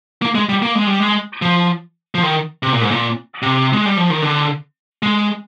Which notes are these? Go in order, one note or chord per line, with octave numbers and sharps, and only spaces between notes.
A#3
G#3
G3
A#3
G#3
G3
G#3
F3
F3
D#3
C3
A#2
G#2
A#2
C3
G#3
G3
F3
D#3
D3
G#3